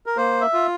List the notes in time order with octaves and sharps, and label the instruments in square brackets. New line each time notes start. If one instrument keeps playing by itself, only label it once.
[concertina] A#4
A#3 C5
E5
F4